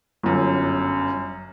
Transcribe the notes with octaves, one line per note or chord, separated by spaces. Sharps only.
G1 F#2